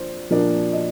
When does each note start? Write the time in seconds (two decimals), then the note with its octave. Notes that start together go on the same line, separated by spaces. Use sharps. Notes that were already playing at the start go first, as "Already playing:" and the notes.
Already playing: F3 A#3 D4 C5
0.30 A#2 F3 A#3 D4
0.73 D#5